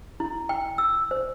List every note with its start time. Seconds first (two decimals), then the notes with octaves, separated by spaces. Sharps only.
0.20 E4
0.49 G5
0.78 E6
1.11 C5